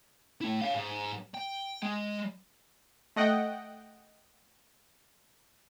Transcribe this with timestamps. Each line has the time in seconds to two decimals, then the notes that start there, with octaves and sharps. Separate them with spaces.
0.41 A3 E4
0.61 C#5 F5
0.75 G#2
1.34 G5
1.83 G#3
3.16 A3 D#5 F#5 G5